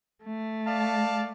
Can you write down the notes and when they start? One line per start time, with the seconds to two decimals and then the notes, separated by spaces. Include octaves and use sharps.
0.23 A3
0.66 D5 F5 A5